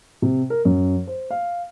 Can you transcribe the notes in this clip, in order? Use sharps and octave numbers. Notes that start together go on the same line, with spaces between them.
C3
A#4
F#2
C5
F5